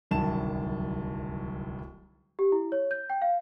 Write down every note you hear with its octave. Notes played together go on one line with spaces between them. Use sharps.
D1 C2 F#2 D#3 A5 E7
G4
E4
C#5
G6
G5
F5